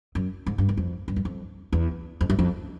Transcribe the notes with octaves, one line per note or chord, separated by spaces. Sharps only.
F#2
G#2
G2
F#2
F2
G2
F#2
F2
E2
F2
F#2
F2